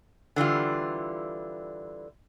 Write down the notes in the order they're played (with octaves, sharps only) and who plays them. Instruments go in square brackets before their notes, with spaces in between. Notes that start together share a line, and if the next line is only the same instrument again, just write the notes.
[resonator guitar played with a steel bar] D3 E3 G3 F4